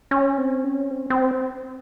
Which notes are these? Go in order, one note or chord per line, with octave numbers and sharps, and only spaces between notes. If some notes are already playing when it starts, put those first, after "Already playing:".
C#4
C4
C#4
C4
C4